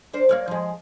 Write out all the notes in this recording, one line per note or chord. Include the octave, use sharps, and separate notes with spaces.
D4 A#4 C5
A#3 C#5 D5
F3 G#3